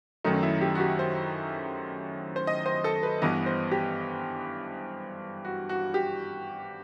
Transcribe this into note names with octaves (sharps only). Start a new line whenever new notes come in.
F#2 D#3 F#3 A3 D#4
D#4
E4
G4
F#4
G4
C5
C5
D#5
C5
A4
B4
G2 E3 B3 D#5
C5
G4
F#4
F#4
G4